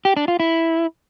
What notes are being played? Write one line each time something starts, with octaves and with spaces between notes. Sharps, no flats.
G4
D4
F4
E4